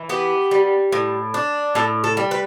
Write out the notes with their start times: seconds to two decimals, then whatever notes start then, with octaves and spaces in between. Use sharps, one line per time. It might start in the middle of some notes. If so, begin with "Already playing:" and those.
Already playing: E3
0.09 B3 G4
0.51 G3
0.92 A2
1.34 D4
1.75 A2 A4
2.04 A4
2.17 G3
2.31 B4